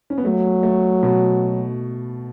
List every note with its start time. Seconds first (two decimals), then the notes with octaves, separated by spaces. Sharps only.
0.10 C#4
0.18 B3
0.25 F#3 A3
0.63 A3
1.03 B2